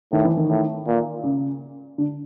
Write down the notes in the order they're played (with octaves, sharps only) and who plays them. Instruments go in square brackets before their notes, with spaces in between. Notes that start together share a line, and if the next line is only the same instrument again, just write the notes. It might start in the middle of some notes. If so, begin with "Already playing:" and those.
[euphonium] A2 [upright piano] D#3
[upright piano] E3
D#3
[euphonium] A2
A#2
[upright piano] C#3
D3